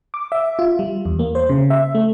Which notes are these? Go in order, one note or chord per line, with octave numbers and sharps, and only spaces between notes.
D6
E5
F4
G3
E2
A#3
C5
C#3
E5
A3